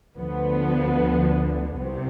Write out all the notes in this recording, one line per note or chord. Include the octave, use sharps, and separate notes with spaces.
D2 D3 F3 B3
C2 C3